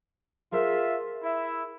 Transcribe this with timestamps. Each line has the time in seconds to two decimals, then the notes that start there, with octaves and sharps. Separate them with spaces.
0.52 F4 G#4 A#4 C5 E5
1.23 E4 E5